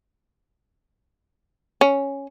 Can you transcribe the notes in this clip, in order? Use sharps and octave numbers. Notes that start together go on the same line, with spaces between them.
C#4